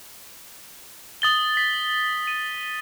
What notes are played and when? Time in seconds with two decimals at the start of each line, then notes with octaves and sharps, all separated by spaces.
1.22 D#6 A6 G7
1.57 B6
2.27 D#7